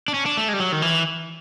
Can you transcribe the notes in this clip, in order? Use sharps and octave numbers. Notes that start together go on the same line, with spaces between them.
D4
C#4
D4
A3
G#3
G3
F#3
D#3
E3